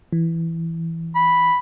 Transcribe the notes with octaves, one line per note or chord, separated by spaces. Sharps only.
E3
B5